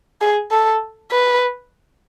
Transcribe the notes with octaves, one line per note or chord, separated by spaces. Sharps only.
G#4
A4
B4